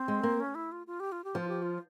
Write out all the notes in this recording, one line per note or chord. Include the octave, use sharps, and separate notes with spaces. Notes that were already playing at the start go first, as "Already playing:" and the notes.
Already playing: C4
G#3
A#3
C#4
E4
F4
F4
G4
F4
G4
F3 F4
G4
F4